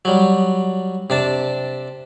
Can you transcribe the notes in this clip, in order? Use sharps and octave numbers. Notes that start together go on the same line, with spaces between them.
F#3 G3
C3 D4 A5